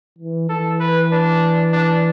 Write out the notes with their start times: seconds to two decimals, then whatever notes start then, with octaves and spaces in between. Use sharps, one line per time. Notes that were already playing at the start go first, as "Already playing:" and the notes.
0.18 E3
0.49 E3 A4
0.80 B4
1.12 D4
1.73 D4